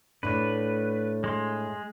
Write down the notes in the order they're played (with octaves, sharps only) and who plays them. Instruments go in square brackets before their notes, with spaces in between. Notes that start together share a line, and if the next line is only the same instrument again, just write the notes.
[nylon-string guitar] A2 A3 D4 [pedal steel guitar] B4
[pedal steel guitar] G#3 C6